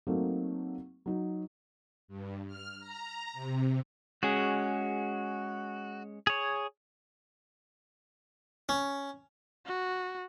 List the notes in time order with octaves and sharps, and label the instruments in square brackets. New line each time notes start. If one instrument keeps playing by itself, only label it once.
[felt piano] F#3 A3 A#3 C4 D#4
F#3 D#4
[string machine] G2
F6
A#5
C3
[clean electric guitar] G#3 C#4 G#4 [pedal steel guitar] F#4
[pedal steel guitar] G#4 C#5
[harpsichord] C#4
[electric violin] F#4